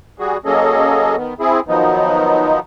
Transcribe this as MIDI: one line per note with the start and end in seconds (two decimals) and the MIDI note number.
0.19 0.37 55
0.19 0.37 66
0.19 0.37 68
0.45 1.16 54
0.45 1.16 58
0.45 1.16 61
0.45 1.16 68
0.45 1.16 69
0.45 1.16 75
1.17 1.34 51
1.17 1.34 59
1.40 1.60 60
1.40 1.60 64
1.40 1.60 68
1.68 2.59 51
1.68 2.59 53
1.68 2.59 54
1.68 2.59 59
1.68 2.59 63